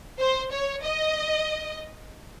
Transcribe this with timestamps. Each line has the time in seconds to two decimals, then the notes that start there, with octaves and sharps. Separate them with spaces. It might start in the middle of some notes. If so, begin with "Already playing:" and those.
0.21 C5
0.52 C#5
0.84 D#5